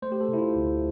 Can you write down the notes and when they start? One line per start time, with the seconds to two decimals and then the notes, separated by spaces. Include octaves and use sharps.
0.02 A3 C5
0.12 G4
0.21 A4
0.28 C3
0.33 E4
0.38 F4
0.55 D2